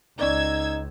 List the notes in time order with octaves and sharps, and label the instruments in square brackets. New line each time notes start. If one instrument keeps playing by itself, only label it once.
[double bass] C#2 [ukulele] C#4 D5 [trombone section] D#4 [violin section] E6 G#6